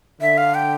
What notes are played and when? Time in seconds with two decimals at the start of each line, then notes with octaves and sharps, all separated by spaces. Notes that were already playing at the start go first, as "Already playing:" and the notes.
0.22 D3 E5
0.38 F5
0.55 G5